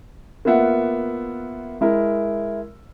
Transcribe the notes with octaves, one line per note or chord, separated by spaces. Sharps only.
A#3 B3 F4 E5 F#5
G#3 E4 A#4